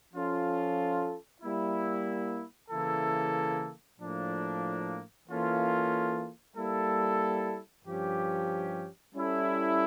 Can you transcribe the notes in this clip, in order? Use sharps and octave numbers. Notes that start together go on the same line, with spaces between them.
F3 C#4 F4 A4
G3 A#3 E4
C#3 E3 A#3 E4 A4
A2 F3 A#3 D4
E3 A#3 C#4 F4 A4
G3 A#3 E4 A4
G2 F3 C#4 G4
G3 C#4 E4 A4